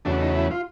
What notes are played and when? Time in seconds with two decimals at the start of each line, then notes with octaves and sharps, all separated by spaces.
0.05 E2 C#3 F#3 A3 D4
0.20 D#4
0.35 E4
0.51 F4